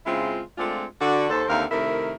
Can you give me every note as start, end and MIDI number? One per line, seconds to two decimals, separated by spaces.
0.06 0.40 49
0.06 0.40 56
0.06 0.40 60
0.06 0.40 64
0.06 0.40 65
0.58 0.84 56
0.58 0.84 57
0.58 0.84 60
0.58 0.84 62
0.58 0.84 65
1.00 1.26 50
1.00 1.26 62
1.00 1.26 66
1.30 1.45 39
1.30 1.45 69
1.30 1.45 72
1.49 1.65 39
1.49 1.65 50
1.49 1.65 60
1.49 1.65 70
1.49 1.65 76
1.49 1.65 77
1.71 2.12 48
1.71 2.12 51
1.71 2.12 57
1.71 2.12 64
1.71 2.12 70